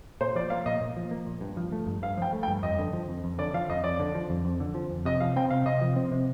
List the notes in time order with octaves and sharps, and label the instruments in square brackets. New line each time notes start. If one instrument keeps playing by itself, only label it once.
[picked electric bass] A#2 [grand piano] C5
[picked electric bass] F3 [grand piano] D5
[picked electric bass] A#3 [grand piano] F5
[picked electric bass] A#2 [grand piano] D#5
[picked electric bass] A#2
F3
A#3
A#2
G2
F3
A3
G2
[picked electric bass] G2 [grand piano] F5
[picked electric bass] F3 [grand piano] G5
[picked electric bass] A3
[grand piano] G5
[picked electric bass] G2
[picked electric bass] F2 [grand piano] D#5
[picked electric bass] D3
F3
F2
F2
[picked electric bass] D3 [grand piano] D5
[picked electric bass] F3 [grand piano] F5
[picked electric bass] F2 [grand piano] D#5
[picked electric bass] F2 [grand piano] D5
[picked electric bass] D3
F3
F2
F2
D3
F3
F2
[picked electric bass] C3 [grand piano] D#5
[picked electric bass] F3 [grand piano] F5
[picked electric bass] C4 [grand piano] G5
[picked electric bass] C3 [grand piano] F5
[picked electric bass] C3 [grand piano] D#5
[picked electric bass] F3
C4
C3